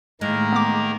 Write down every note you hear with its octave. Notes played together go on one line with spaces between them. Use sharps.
A2 D#3 G#3 A#3 A#4
B3 D6